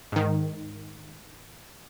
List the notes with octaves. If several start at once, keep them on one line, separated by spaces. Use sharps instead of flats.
G#2 D#3